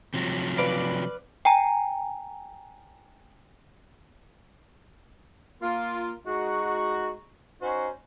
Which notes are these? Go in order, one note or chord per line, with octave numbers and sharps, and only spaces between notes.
C3 F3 F#3
B4 D5 F5
G5 G#5 A#5
A#3 F4
G#3 D#4 F#4
C#4 D#4 F#4 C5